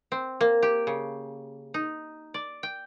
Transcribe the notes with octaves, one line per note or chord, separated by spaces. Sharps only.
C4
A#3
G4
C#3
D#4
D5
G5